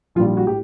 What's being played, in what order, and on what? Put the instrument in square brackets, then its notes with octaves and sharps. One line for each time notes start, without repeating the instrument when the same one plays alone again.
[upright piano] A#1 A#2 G3 F4
F4
F#4
A2 G4